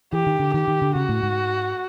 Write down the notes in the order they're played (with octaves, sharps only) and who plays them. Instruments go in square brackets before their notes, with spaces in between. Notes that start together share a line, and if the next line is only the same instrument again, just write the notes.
[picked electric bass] E3 [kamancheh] G4
[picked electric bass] D#3
D3
[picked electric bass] D#3 [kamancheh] G4
[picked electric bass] D#3
D3
[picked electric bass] C#3 [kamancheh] F#4
[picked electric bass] A2
G#2